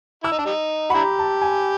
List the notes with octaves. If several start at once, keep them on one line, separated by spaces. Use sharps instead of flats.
E4 E6
D#4
D4
G3 D#4
F#4 B5
D4 E4 G4 A#5
A5
G#5